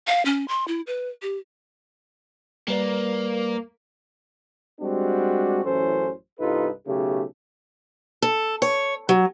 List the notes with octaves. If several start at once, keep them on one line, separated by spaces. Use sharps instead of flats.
F5
C#4
C6
E4
B4
G4
G3 A#3 B4 D5
G3 G#3 C4 D4 F#4
A1 F#2 E3 C#4 A4 C5
C2 G2 D#4 F4 A4 B4
B1 C#3 A3 G4
A4
C#5
F#3